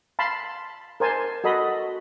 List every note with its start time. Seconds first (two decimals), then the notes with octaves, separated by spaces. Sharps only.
0.19 F5 A5 B5 C6
1.00 A#4 C5 G#5 A5
1.44 F#4 A4 D#5 B5